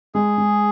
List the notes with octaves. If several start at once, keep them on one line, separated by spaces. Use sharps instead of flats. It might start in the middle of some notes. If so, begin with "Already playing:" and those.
G#3 G#4
G#3